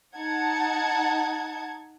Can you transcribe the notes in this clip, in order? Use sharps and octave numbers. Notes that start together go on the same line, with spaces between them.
D#4 F#5 A5 G#6